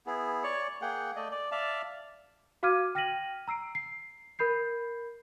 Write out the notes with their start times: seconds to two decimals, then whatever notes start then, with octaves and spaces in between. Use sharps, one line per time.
0.07 B3 E4 G#4
0.44 C#5 D5 C#6
0.82 A#3 G#4 F#5 G5
1.16 A3 D5 D#5
1.31 D5
1.52 D5 E5 F5 A5
2.63 F#4 F5 D6 F6 G#6 D#7
2.95 G5 F6 A#6 B6 D#7 F#7
3.48 A#5 E6 C7 D7
3.75 C7
4.39 A#4 B5 G6 C7